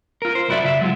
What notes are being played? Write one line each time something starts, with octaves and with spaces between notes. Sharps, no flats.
F4 A#4
C5
C2 F#2 E4 F#4 D5 E5
C#3 E5
F#3 G#3 F4